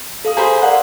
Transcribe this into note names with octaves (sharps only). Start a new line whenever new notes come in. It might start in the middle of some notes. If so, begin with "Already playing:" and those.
A4 F5 D#6
G#4 C5 A#5 B5
A#4 D5 F5 F#5